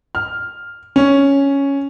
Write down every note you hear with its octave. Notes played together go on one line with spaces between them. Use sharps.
F6
C#4